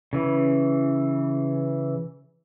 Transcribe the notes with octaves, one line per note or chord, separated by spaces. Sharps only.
C#3 E3